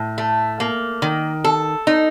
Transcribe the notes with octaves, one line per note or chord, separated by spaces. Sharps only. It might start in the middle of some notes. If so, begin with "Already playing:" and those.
Already playing: A2
A3
A#3
D#3
A4
D#4